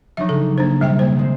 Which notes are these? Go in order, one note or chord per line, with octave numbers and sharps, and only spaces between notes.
F3 F#3 D4 D#4 E5
C#3 A4
A#3 D4 C5
E1 G3 E5 G5
A#3 C5
D#3 G#3 C4